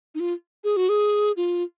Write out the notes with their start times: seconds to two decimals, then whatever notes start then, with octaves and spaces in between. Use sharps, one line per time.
0.15 D#4
0.20 F4
0.64 G#4
0.77 F#4
0.89 G#4
1.37 F4